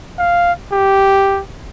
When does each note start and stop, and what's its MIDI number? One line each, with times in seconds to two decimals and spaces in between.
0.19 0.52 77
0.73 1.41 67